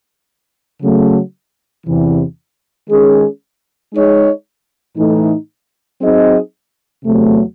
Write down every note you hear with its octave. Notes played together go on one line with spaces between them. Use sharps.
C#3 F#3 A3
E2 C3 E3
D#3 G#3 C#4 G#4
G#3 D#4 G#4 C#5
A2 E3 A3 D#4
F#3 C4 D#4 G#4 D#5
E2 C3 F#3 A3